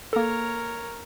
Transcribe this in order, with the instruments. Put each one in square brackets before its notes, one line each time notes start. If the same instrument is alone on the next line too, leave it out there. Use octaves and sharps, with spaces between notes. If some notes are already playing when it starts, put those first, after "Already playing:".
[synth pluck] A#3 A4 [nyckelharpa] A#4 C#5